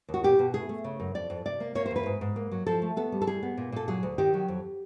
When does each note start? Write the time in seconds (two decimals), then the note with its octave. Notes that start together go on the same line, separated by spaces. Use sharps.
0.09 D#2
0.14 F#4
0.24 B2 G4
0.39 B2
0.54 A3 G#4
0.69 A3
0.84 C#3
1.00 F#2
1.15 F2 D5
1.30 F2
1.45 C3 D5
1.60 A#3
1.75 A#3 C#5
1.86 C5
1.91 E2 B4
2.06 G#2
2.21 G#2
2.36 A#3
2.51 F#3
2.66 F3 A4
2.82 A3
2.97 B3 A4
3.12 G3
3.22 A4
3.27 G3 G#4
3.43 B3
3.57 A#2
3.72 A#2 A4
3.88 F#3 G#4
4.03 D2
4.18 D#3 G4
4.34 F#3
4.48 F2